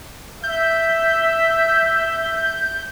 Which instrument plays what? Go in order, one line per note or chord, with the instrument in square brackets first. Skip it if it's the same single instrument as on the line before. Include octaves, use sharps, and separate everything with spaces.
[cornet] E5 [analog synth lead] G6